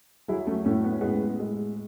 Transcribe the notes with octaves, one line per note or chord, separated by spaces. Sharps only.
F#3 E4 G#4
A3 C#4
A2 A3 C#4
B3
C#4
A2 G#3 B3
G#3